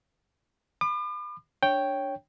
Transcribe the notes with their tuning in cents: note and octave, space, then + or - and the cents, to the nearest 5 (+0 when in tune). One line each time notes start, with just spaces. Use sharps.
B5 +25 D6 +45
D4 -5 C#5 -5 G5 +0